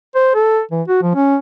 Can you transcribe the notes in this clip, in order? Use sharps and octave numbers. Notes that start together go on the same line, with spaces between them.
C5
A4
E3
F#4
F3
C#4